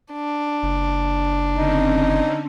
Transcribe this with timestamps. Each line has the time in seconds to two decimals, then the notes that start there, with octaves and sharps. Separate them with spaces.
0.13 D4
0.63 F#1
1.56 D3 C4 C#4 D#4